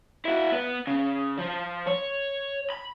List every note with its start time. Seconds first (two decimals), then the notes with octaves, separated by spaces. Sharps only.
0.25 E4 F#4
0.52 B3
0.87 C#3
1.38 F3
1.87 C#5
2.70 B5